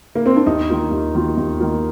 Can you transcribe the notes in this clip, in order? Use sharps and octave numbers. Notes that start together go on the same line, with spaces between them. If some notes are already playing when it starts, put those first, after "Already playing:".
A#3
C4
D4
D#2 D#4
D#3 A#3 F4
D#2
D#3 A#3 F4
D#2
D#3 A#3 F4